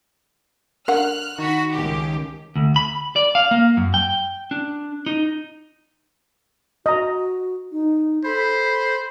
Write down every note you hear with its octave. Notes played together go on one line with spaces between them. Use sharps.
D3 A#4 F#5 F6 F#6
D#3 F#4 B5
C#2 G4
D2
B5
D5
F5
A#3
F#2
G5
D4
D#4
F#4 D#5 A#5
D#4
A4 C5 B5